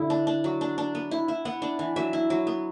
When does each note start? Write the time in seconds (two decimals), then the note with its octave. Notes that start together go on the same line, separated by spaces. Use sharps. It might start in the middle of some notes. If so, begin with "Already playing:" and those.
Already playing: D3 E4
0.10 D4
0.27 D4
0.44 F#3
0.61 D4
0.78 D4
0.95 B3
1.11 E4
1.28 E4
1.45 B3 F#5
1.62 D4
1.79 E3
1.96 F#3 E5
2.13 E4
2.30 F#3
2.47 B3